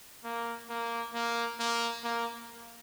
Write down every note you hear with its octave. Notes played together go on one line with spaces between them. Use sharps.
A#3
A#3
A#3
A#3
A#3